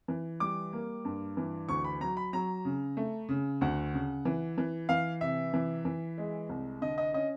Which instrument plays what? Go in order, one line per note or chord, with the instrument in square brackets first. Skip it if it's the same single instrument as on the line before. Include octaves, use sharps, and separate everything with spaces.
[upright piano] E3
[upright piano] G3 [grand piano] D6
[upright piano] A#3
G2
E3
[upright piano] D2 [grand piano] C#6
[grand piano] B5
[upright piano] F#3 [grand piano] A#5
[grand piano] B5
[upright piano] F#3 [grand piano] A#5
[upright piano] C#3
A3
C#3
[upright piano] D2 [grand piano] F#5
[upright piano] C#3
E3
E3
[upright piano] E3 [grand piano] F5
[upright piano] C3 [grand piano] E5
[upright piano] E3
E3
G#3
C2
[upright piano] D3 [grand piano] D#5
[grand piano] D#5
[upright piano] C#4 [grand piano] D#5